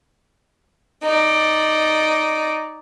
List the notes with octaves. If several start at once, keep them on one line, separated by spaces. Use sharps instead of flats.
D#4 D5